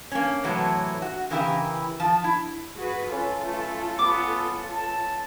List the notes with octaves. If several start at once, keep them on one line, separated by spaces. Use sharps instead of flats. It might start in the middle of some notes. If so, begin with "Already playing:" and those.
A#3 C#4
A2 C3 E3 F#3 A3
F#4
C#3 E3 A#3 E4 G4 A#4
F3 A5
E4
F#4 G#4 B4
C#4 F4 A4 B4
A3
B3 D6
A5